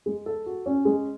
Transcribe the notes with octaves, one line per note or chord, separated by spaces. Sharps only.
G#3
A4
F#4
C#4
G#3